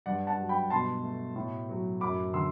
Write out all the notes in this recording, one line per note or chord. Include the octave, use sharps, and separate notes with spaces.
G2 D5 F#5
F#5 A5
F#3
G5 B5
B2 A5 C6
A3
A2
F#3
F#2 B5 D6
D3 C6 E6